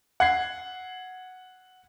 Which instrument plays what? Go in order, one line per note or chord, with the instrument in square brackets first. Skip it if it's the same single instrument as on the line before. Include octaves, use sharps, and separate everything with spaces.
[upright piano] F#5 G#6 C7